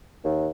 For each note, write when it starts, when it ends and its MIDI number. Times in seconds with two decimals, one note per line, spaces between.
0.24 0.48 39